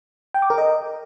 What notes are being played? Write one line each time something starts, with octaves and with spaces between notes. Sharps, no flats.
G5
D6
A#4
D#5